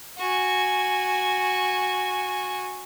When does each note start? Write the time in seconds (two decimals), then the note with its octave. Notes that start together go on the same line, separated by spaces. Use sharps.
0.18 F#4 G#5